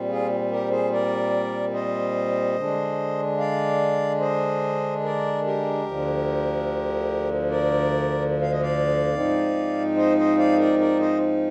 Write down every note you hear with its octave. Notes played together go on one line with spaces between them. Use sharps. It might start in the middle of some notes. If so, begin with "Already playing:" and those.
Already playing: A#2 G3 C4
F4 G#4
G4 A#4
G#4 C5
A#4 D5
C5 D#5
D3 G#3 D4
D5 F5
C5 D#5
A#4 D5
G4 A#4
D2 D3 F3
A#4 D5
F5
D#5
D5 F5
G#2 F3 C4 D#4
C5 D#5
C5 D#5
D5 F5
A#4 D5
A#4 D5
C5 D#5